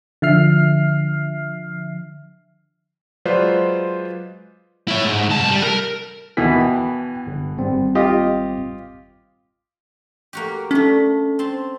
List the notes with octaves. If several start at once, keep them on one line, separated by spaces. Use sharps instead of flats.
D3 F3 E5 F6 C7
F#3 G#3 F4 B4 C5 D5
E4 C#5
G#2
C2 A5
G3
A#4
D#2 B2 D#3 E3 B6
G5
G1
G#1 G3 C4
F4 G4 D#5
A#3 F#4 G4
A3 C#4 D4
C4 A5 C6